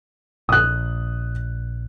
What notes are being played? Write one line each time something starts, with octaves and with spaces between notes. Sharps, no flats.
A#1 D#6 F#6